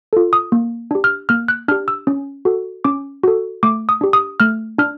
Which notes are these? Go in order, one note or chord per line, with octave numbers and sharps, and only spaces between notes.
F4 A4
D#6
A#3
D4 G4
F6
A#3 F6
F#6
D4 G4 F6
E6
C#4
F#4 A4
C#4 D6
F#4 A4
A3 D6
D#6
D4 G4
D#6
A3 F6
D4 F6